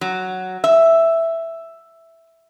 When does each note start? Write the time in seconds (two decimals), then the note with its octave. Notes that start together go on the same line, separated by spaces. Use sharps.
0.01 F#3
0.64 E5